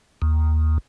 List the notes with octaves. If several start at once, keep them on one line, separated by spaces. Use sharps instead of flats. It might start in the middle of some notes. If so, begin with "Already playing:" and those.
D#2